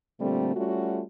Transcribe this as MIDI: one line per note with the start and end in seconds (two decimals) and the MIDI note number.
0.20 0.54 46
0.20 0.54 50
0.20 0.54 55
0.20 0.54 57
0.20 0.54 60
0.56 1.01 55
0.56 1.01 57
0.56 1.01 61
0.56 1.01 65
0.56 1.01 66